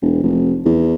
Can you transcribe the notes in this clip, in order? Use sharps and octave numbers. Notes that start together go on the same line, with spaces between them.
E1
F1
E2